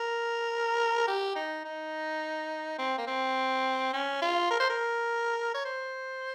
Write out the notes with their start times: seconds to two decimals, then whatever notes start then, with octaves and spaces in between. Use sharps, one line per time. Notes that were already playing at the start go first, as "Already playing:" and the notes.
Already playing: A#4
1.07 G4
1.35 D#4
1.64 D#4
2.78 C4
2.98 A#3
3.07 C4
3.93 C#4
4.22 F4
4.51 A#4
4.60 C5
4.70 A#4
5.54 C#5
5.65 C5